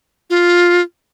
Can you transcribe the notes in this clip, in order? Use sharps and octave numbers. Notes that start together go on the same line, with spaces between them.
F4